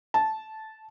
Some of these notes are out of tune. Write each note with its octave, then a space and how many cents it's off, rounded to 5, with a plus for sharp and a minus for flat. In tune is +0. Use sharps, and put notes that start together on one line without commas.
A5 -10